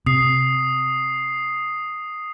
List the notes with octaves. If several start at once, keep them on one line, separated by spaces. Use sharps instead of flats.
C3 D#6 C7